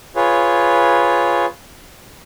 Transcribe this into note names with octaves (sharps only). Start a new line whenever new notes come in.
F4 G#4 B4 C#5